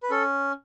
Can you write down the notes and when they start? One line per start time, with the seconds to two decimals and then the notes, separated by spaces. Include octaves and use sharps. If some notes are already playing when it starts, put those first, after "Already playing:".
0.03 B4
0.10 C#4 A4